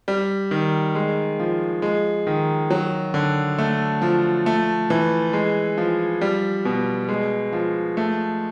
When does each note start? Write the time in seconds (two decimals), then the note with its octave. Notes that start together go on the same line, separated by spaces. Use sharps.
0.08 G3
0.51 D#3
0.95 G#3
1.39 F3
1.82 G#3
2.27 D#3
2.71 F#3
3.14 D3
3.59 A3
4.02 F3
4.46 A3
4.90 E3
5.33 G#3
5.78 F3
6.21 G3
6.65 B2
7.09 G#3
7.53 F3
7.97 A3